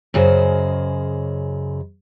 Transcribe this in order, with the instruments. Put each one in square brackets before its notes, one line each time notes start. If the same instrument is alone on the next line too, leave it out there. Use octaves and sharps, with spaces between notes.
[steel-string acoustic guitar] F#2 C#3 G#4 C5 D#5